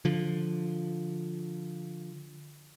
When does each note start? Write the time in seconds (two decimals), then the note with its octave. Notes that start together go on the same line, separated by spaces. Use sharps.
0.05 D3 F3